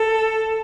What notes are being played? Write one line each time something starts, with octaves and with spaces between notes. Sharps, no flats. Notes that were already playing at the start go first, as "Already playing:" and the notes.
Already playing: A4